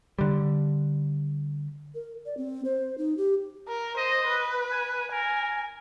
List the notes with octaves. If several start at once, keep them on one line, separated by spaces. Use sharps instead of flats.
D3 G3
A#4
D5
C4
C5
D#4
G4
A#4
C5 D#5
B4
G#5
A#4 G#5